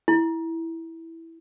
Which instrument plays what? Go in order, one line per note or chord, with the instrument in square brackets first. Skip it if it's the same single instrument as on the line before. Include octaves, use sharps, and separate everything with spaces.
[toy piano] E4